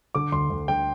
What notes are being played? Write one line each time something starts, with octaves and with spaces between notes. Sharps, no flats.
D3 D6
D2 C6
D2
D3 G5